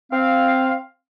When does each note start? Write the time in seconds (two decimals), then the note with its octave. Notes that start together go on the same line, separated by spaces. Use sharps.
0.12 C4 F5